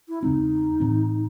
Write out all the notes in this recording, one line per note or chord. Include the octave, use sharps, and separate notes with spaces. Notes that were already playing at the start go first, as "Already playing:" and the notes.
E4
E2 C#3 G#3 C4 D#4
A2 E3 C4